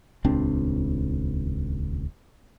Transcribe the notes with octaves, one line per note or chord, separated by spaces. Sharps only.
D#1 C#2 C4 D4